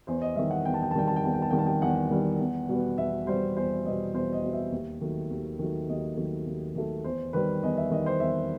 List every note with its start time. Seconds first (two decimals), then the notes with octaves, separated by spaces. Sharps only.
0.07 E2 C5
0.22 D#5
0.36 D#3 G3 E5
0.51 F#5
0.65 E2 G5
0.74 A5
0.83 G5
0.91 A5
0.95 D#3 G3 G5
1.08 A5
1.16 G5
1.24 E2 A5
1.34 G5
1.42 A5
1.51 D#3 G3 G5
1.58 A5
1.67 G5
1.82 E2 F#5
2.10 D#3 G3
2.40 E2
2.68 B2 G3 B3
2.98 E2 E5
3.27 B2 G3 B3 C5
3.56 E2 C5
3.85 B2 G3 B3 D#5
4.14 E2 C5
4.33 D#5
4.43 B2 G3 B3
4.53 E5
4.72 D#2
5.01 D#3 F#3 A3
5.30 D#2
5.59 D#3 F#3 A3
5.89 D#2 D#5
6.17 D#3 F#3 A3
6.46 D#2
6.75 D#3 F#3 A3
7.04 E2 C5
7.33 D#3 G3 B4
7.63 E2 D#5
7.77 E5
7.91 D#3 G3 D#5
8.06 C5
8.20 E2 E5